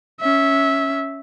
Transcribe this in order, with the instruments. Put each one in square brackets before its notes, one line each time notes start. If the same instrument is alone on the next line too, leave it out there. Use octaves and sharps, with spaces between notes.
[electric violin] C#4 E5